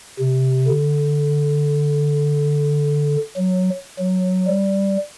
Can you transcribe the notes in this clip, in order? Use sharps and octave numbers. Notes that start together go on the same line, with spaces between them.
C3
D3
F#3
F#3
G3